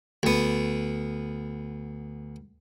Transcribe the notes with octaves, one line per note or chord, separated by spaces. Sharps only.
D2 B3